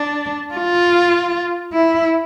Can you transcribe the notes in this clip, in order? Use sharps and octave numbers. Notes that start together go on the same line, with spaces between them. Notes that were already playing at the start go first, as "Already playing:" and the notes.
Already playing: D4
F4
E4